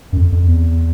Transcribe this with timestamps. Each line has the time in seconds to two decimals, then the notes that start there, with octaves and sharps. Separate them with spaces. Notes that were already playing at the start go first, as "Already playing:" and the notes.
0.12 F#2
0.17 F2
0.32 F2
0.46 E2